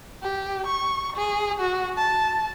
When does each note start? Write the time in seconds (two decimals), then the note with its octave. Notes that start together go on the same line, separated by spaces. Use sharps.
0.22 G4
0.67 C#6
1.16 G#4
1.60 F#4
1.97 A5